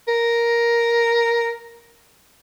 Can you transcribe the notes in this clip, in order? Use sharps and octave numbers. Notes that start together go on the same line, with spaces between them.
A#4